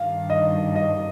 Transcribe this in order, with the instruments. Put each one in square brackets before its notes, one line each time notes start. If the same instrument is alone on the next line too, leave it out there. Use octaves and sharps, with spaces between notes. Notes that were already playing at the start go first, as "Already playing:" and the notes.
Already playing: [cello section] G2 D#3 G3 D4 [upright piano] F5
[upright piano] D#5
D#5